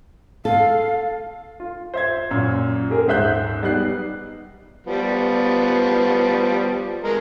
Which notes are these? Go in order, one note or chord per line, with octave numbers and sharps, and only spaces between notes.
A4 F5
F4
C5 E5 G#6
F#2 A#2 E6
G4 G#4 A#4
D#1 G#2 C5 E5 F#6 G6
G3 B3 D#4 G4 F#6 C7
F3 G3 B3
G#3 A#4